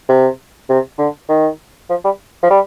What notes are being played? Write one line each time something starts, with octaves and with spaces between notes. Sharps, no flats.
C3
C3
D3
D#3
F3
G3
F3
G3